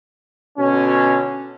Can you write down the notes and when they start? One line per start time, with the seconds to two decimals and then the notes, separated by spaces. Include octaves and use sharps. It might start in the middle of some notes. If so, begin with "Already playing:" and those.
0.58 B2 D3 C#4